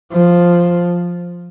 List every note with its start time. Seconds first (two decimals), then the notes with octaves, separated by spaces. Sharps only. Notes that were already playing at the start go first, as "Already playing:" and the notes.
0.13 F3